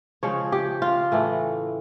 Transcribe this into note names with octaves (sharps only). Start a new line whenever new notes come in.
C#3 F3 G#3 C#5
G4
F4
A2 E3 A3